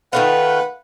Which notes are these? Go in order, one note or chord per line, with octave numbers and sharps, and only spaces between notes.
D#3 A3 F4 B4 F#5